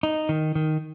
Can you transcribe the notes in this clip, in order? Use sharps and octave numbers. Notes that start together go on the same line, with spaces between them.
D#4
D#3
D#3